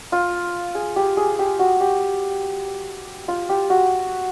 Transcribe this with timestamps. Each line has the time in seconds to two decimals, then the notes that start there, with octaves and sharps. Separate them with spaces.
0.12 F4
0.75 G#4
0.96 G4
1.17 G#4
1.39 G4
1.59 F#4
1.81 G4
3.28 F4
3.49 G4
3.70 F#4